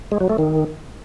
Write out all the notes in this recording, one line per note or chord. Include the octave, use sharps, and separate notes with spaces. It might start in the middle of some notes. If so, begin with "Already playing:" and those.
G#3
F#3
A3
D#3